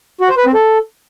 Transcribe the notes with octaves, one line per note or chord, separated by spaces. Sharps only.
F#4
C5
B4
C4
A4